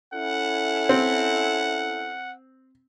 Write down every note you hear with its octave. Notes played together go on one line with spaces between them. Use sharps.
C#4 E4 A4 F#5
C4